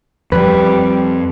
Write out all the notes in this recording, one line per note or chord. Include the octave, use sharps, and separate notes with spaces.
F2 G3 B4